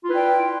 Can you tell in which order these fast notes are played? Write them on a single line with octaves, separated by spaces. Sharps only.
F4 E4 B4 D4 G5